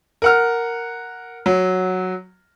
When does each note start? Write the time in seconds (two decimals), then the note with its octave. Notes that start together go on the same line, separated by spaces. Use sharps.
0.22 A#4 F#5 F6
1.46 F#3